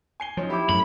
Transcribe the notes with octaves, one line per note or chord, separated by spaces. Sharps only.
G#5 C7 G7
F3 F#3 C#4 D#4
E4 G4 D6
F#2 A2 B5